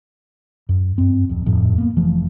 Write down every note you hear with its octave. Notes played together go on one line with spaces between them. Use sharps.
F#2
G2 C4
D1 F2
D#1 F2 A2 F3
A#3 B3
F1 E3 F3 A3